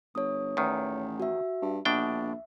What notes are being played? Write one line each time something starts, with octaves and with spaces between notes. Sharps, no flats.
G1 C#5 D#6
A1 E2 D#3
F#4 E5
G2
A#1 B2 D4 E5 G5